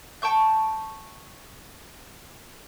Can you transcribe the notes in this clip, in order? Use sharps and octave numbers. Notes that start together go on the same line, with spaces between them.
G5 A5 C#6 G6